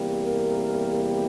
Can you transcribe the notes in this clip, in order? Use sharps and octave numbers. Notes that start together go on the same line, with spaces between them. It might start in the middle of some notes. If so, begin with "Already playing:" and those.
Already playing: E2 C3 G3 A#3
A#4